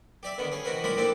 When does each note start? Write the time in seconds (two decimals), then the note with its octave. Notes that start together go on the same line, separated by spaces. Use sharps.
0.23 G4 D5 E5
0.38 D3 D#3 B3
0.52 C#4 G#4
0.65 C3 E3 D#4 F#4 A#4 B4
0.84 A#1 F3 G#3 G4 A#4 B5
0.98 A#3 C4 D4 E4 G4 A4